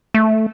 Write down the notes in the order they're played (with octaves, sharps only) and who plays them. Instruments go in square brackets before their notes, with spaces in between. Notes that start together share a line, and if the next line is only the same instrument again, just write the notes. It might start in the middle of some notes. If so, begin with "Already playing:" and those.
[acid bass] A3